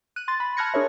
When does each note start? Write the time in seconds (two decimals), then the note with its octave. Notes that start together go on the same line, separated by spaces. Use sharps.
0.16 F#6 D#7
0.28 C6 A6
0.40 B5
0.57 A5 F6 F#6 G#6 A#6 C#7
0.74 D4 G#4 A#4 C#5 E5